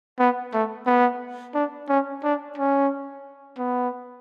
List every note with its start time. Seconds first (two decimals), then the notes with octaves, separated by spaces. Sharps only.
0.19 B3
0.53 A3
0.87 B3
1.54 D4
1.89 C#4
2.23 D4
2.57 C#4
3.58 B3